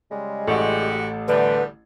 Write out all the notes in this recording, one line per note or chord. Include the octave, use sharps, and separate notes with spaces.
C#3 G3 G#3
A1 A3 F#4 G4
E2 D3 G3 B4